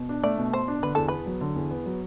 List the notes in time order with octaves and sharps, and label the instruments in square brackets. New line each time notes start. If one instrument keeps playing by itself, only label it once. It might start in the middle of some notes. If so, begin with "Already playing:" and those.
Already playing: [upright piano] B2
D4
[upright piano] A3 [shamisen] D5
[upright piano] B2
[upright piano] B2 [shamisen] C5
[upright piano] D4
[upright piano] D3 [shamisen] B4
[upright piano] E2 [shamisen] A4
[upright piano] B3 [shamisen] B4
[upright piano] F#3
D3
E2
B3
F#3